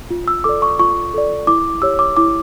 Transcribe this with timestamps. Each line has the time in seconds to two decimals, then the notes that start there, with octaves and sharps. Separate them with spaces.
0.10 F4
0.28 E6
0.44 A4 D5 D6
0.62 C#6
0.79 F4 C#6
1.14 A4 D5
1.47 E4 D6
1.82 G4 C#5 E6
1.99 D6
2.17 E4 D6